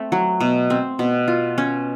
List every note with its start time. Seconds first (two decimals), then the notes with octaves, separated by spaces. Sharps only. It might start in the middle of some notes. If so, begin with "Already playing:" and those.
Already playing: A3 C4
0.12 F#3
0.40 B2
0.70 C4
0.99 B2
1.28 F4
1.58 C#4